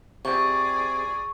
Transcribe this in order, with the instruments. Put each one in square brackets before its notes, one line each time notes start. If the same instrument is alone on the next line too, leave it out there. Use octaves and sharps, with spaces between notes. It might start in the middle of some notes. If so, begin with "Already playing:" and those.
[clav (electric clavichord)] C3 [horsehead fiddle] G#4 D5 [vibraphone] C#6